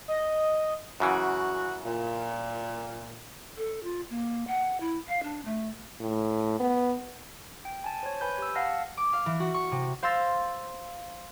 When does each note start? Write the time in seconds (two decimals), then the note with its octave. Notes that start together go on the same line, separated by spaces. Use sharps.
0.08 D#5
1.00 F#2 C#3 E3 F#4
1.85 A#2
3.57 A4
3.83 F4
4.10 A#3
4.47 F#5
4.80 E4
5.08 F5
5.23 D4
5.45 A3
6.00 A2
6.60 B3
7.65 G5
7.84 G#5 A5
8.03 C5 C#5
8.21 B4 G#5 B5 G6
8.38 G4 E6
8.55 F5 F#5 A5 F6 A#6
8.97 D6
9.13 F5
9.26 E3
9.40 F#4
9.54 C#6
9.72 C3
10.02 C5 F5 C6 E6 A6 A#6